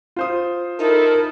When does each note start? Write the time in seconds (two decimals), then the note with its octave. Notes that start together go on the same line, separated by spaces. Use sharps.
0.16 F4 C5 D#6
0.79 D#4 E4 A4 A#4